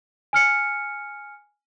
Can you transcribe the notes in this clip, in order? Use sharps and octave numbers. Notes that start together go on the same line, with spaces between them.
G#5 F6 C#7